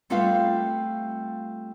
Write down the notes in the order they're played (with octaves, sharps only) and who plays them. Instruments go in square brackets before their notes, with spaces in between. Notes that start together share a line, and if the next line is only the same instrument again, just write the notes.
[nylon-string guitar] G3 A3 C4 F4 B4 F5